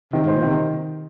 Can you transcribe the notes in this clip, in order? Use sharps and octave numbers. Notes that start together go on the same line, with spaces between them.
C3 D#3
G#2 C5
A#2
C3 D#3